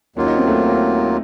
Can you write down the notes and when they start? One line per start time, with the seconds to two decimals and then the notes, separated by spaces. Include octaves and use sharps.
0.16 D#2 D#3 F#3 A#3 C#4 F4
0.27 D#4
0.38 C4
0.47 A3